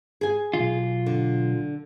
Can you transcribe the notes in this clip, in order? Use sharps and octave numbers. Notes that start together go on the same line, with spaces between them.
G#4 G#5
B1 F4
D3